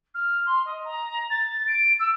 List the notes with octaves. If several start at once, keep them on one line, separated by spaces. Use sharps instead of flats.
F6
C6
D#5
A#5
A6
D7
E6